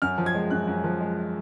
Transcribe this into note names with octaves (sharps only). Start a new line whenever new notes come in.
F#2 F6
F3
G#6
G#3
F#2 F#6
F#2
F3
G#3